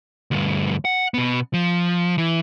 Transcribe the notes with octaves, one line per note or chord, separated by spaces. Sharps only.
D2 G2
F#5
B2 B3
F3
E3